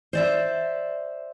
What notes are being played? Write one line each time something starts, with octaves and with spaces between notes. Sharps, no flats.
C5 D5 E5